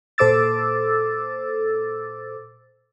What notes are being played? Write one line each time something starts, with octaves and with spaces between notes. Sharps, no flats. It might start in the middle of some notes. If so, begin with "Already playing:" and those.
A#2 A4 C5 D6 E6 A6